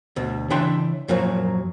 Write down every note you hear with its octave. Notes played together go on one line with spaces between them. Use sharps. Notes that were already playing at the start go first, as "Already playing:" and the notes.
D2 B2
C#3 E3 D4 E5 G5 C6
F#2 A#2 F3 F#3